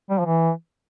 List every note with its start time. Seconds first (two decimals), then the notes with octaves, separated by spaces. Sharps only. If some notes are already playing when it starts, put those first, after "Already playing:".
0.10 G3
0.19 F3
0.26 E3